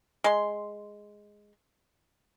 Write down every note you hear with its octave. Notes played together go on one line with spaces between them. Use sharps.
G#3 C6